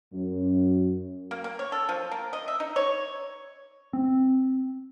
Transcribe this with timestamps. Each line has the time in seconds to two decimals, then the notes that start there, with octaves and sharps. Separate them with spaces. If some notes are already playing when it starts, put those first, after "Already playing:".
0.12 F#2
1.31 A#3
1.44 A#3
1.59 C#5
1.72 A4
1.89 F3
2.11 A#3
2.33 D#5
2.48 E5
2.60 D#4
2.76 C#5
3.93 C4